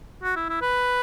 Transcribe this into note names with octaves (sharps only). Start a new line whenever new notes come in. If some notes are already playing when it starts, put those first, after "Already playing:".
F#4
E4
E4
B4